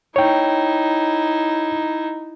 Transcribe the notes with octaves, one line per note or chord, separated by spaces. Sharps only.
D#4 E4 C#5 G5